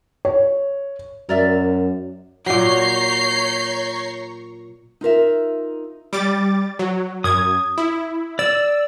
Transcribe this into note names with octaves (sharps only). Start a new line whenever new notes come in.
C#5
F#2 A#4 D5 E5
A#2 F#3 C#5 A#5 C#6 G6 C7
D#4 F4 A#4 E5
G3 D6 A6
F#3
F#2 D#6 G#6
E4
D5 E6